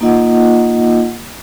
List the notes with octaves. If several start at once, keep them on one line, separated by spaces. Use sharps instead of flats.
A#3 D#4 F4 D#5 F#5